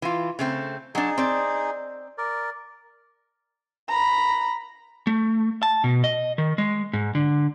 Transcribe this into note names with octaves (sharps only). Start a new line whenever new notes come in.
E3 F4
C#3 A3 C4
F#3 D4 D#4 G#4
C4 D5
A#4 D5
A#5 B5
A3
A5
B2
D#5
D#3
G#3
G#2
D3